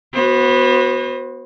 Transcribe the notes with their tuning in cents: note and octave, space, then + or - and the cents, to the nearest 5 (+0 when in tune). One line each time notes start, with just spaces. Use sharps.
B3 -10 F#4 +0 C5 +30